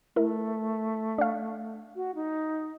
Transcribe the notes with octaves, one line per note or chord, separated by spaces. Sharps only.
A3 E4 A#4
D4 F5
F#4
D#4